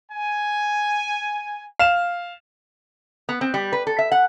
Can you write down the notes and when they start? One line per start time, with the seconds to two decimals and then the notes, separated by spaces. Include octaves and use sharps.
0.12 G#5
1.79 F5 E7
3.29 B3
3.41 C4
3.54 G3
3.72 B4
3.87 A4
3.99 E5
4.12 F#5